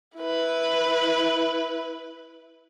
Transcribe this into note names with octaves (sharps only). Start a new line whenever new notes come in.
E4 B4